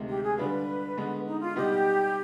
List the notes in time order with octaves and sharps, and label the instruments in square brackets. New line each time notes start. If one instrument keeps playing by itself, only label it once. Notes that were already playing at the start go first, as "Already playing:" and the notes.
Already playing: [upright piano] D2 C3 D#3 G#3
[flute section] G4
G#4
[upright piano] D3 G3 D4 F4 [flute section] B4
[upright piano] D3 G#3 B3
[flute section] D#4
F4
[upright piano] B2 G3 B3 D#4 [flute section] G4